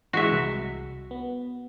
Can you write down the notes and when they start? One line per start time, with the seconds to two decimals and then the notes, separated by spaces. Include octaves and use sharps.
0.13 E3 G#3 F#4 E5
0.32 C2
1.11 B3